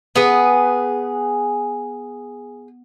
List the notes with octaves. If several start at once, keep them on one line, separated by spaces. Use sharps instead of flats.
B3 G#4 B4